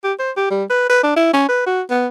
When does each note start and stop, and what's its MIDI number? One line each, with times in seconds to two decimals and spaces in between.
0.04 0.13 67
0.19 0.31 72
0.37 0.46 67
0.51 0.64 55
0.70 0.85 71
0.90 1.02 71
1.03 1.15 62
1.16 1.30 64
1.34 1.46 61
1.49 1.64 71
1.66 1.82 66
1.91 2.07 59